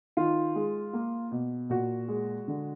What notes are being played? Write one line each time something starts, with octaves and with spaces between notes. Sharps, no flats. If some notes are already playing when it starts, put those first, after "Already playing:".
D#3 F4
G#3
A#3
B2
A#2 F#4
G#3
D3